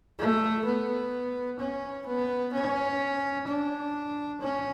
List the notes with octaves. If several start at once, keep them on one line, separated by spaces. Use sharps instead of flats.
A3
B3
C#4
B3
C#4
D4
C#4